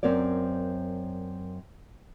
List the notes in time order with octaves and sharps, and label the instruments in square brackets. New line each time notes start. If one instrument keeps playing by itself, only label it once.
[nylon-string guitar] F#2 C4 A#4 C#5 D5